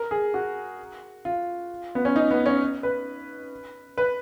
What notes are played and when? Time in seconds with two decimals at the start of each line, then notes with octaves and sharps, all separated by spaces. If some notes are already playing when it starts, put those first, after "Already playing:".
Already playing: A#4
0.11 G#4
0.34 F#4
1.25 F4
1.95 B3
2.05 C#4
2.16 D#4
2.31 B3
2.46 C#4
2.83 B4
3.97 B4